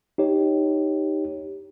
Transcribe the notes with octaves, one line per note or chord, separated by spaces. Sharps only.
D#4 G4 C#5